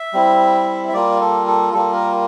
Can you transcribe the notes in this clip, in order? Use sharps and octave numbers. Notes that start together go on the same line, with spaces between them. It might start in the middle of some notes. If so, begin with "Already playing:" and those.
Already playing: E5
G3 C4 E4
E5
G3 A#3 F4 D5
A4
A4
G3 A#3 F4 A4
A#4